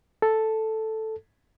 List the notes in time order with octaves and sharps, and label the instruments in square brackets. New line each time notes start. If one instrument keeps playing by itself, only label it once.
[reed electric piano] A4